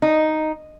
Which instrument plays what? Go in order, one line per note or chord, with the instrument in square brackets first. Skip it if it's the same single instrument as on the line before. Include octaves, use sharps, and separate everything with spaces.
[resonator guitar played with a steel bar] D#4